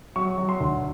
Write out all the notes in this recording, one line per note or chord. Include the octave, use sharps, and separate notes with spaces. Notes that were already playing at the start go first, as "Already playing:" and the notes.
F#3 C#6
F#3
C6
D2